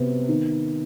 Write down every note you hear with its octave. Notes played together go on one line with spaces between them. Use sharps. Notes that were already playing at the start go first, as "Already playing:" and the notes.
Already playing: C3 B3
D#3